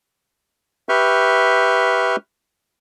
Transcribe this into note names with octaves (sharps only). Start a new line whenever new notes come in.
G4 B4 E5 C#6 F6 G6